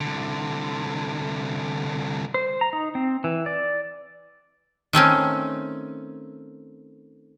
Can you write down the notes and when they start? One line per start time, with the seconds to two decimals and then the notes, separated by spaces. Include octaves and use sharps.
0.01 C2 D3
2.34 C5
2.61 A#5
2.73 D#4
2.95 C4
3.24 E3
3.46 D5
4.93 D#3 A3 C4 C#4